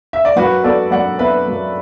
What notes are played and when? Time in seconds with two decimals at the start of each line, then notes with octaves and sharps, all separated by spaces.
0.13 E5
0.25 D5
0.36 F#2 F#4 B4
0.64 B3 A4 D5
0.91 F#2 D5 F#5
1.18 B3 B4 E5
1.47 F#2